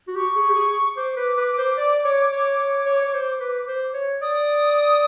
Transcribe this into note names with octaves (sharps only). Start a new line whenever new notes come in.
F#4
G4 C#6
G#4
G4
G#4
C5 D6
B4
B4
C5
D5
C#5
C#5
C#5
C#5
C#5
C5
B4
C5
C#5
D5 D#6